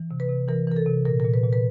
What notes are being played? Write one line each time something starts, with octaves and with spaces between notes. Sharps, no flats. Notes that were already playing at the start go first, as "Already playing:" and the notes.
Already playing: E3
C3
B4
C3
E3 A#4
E3 A#4
A4
C3
A#2 A#4
A#2 A#4
B4
A#2
B4